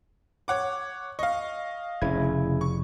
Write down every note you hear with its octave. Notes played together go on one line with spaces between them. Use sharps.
C#5 F#5 D6
D#5 F5 C#6
F1 C#3 E4 G#6
C#6